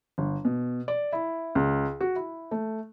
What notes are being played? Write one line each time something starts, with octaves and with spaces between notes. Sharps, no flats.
G1
B2
D5
E4
C#2
F#4
E4
A3